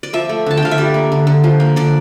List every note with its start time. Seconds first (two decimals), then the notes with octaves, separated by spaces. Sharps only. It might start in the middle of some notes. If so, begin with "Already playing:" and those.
0.03 D5
0.13 F3 E5
0.29 A3
0.46 D3 A5
0.57 G5
0.62 D3 F5
0.71 E5
0.78 G3 D5
0.94 A#3
1.12 D3
1.27 D3
1.44 F3
1.60 A#3
1.76 D3 D5